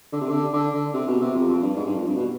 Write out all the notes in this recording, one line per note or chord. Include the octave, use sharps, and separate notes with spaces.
D3
C3
D3
D3
D3
C3
B2
C3
F2
F2
G2
G#2
G2
F2
G2
B2